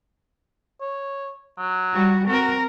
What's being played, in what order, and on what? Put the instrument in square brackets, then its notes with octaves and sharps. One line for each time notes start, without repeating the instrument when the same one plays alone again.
[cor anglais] C#5
F#3
[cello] G3 F#4
[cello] C4 A#4 [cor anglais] F#4